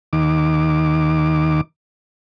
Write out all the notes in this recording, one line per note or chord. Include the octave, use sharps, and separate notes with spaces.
D#2 D#3 D6